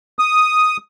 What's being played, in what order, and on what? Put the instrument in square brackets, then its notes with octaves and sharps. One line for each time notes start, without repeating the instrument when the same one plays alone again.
[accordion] D#6